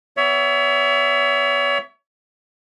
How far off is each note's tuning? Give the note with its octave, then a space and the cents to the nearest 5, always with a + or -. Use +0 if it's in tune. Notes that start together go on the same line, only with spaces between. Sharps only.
B3 +30 C#5 +35 E5 +10